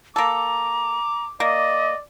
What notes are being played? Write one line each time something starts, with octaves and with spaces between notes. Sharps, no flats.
A#3 A4 A#5 D6
A#3 D5 D#5